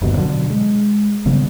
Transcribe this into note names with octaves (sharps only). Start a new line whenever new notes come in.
G1 D#2 B2 D#3
B2 D3 F#3
G#3
G#1 C#3 G3 B3